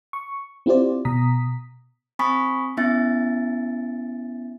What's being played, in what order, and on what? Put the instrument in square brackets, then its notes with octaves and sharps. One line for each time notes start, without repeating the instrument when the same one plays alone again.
[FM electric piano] C#6
C4 E4 F4 G4 C5 D5
B2 A#5 D#6 B6
[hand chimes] C4 G#5 B5 C#6 D#6 B6
B3 C#4 E4 E5 G#5 A6